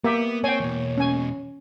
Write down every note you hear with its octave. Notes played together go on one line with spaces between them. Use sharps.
A#3 B3 G4 E5
C4 C#5 G5 G#5
E2 B2
C#4 G#5